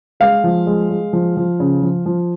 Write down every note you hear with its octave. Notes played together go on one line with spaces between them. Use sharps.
G#3 F5
F3
G#3
G#3
F3
F3
C#3
F3
F3